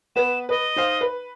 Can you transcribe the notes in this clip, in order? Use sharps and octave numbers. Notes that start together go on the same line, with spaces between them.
B3 B4 E7
B4 D#5
D#4 C5 F5
B4